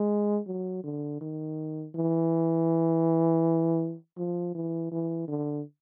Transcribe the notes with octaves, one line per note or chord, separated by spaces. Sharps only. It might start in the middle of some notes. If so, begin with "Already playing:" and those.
Already playing: G#3
F#3
D3
D#3
E3
F3
E3
E3
D3